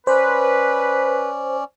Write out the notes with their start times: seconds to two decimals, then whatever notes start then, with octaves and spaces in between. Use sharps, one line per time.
0.07 C#4 B4 C5 D5